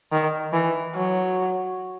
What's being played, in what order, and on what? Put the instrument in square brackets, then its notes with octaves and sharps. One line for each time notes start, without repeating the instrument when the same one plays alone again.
[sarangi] D#3
E3
F#3